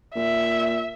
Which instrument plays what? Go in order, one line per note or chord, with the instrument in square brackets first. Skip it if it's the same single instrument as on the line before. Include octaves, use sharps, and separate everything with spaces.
[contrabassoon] A#2 [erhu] E5